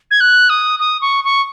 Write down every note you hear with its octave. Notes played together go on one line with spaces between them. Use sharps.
G#6
F#6
D#6
D#6
C#6
C#6